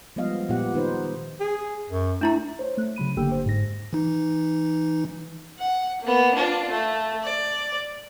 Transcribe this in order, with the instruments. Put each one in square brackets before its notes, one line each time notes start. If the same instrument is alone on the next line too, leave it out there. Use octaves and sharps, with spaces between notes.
[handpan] F3 G3 G#3 B3 D#5 F5
A#2 B3 F4 G4 F#5
D#3 D#4 B4 C5
[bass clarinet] G#4
F#2
[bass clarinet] A3 [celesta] D4 E4 A#5
[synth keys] C5 C#5
A3 F#6
C#3 F#3 B5 D#7
G1 D3 A#3 G4 G5 E6
C5
G#2 A#6
[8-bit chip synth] E3 D#4
[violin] F#5
A#3 B3
D4 F4
A3
D5